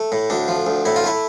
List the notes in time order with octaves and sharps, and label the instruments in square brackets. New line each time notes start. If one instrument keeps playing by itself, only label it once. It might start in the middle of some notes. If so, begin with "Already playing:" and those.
Already playing: [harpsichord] A3
A2
D2 D4
F3
D2
A2 E4
F4
A3 E4